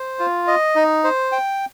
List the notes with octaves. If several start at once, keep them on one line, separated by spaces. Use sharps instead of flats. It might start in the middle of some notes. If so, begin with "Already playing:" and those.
Already playing: C5
F4
D#5
D#4
C5
G5